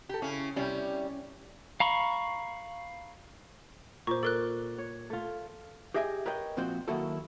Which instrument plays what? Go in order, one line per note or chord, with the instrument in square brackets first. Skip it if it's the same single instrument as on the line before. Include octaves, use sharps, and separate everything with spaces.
[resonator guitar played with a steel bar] G4 A4
[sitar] C#3 C#4 [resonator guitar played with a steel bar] E4
[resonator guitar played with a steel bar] C3 G3 E4 [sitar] C#4
[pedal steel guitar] F5 A#5 B5 C#6
[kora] A#2 [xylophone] C5 C#6
[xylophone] A4 A#4 F#6 [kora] D5
[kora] C#5
A3 F4
[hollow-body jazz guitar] G4 G#4 D#5 E5 G5 G#5
A#4 B4 C#5 D#5 G5
A#2 F3 C4 F#4 C5
D#3 F#3 A#3 E4 F#4 A4